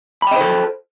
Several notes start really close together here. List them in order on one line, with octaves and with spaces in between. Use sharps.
B5 G5 D#5 C5 A4